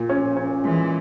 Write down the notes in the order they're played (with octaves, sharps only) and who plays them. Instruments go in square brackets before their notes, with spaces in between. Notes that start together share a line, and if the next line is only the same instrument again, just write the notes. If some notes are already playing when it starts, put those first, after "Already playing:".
Already playing: [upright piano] A#2
C#4
C#4
[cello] E3 [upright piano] G#3